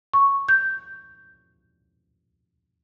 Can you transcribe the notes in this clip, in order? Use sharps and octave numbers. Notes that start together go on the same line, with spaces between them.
C#6
G6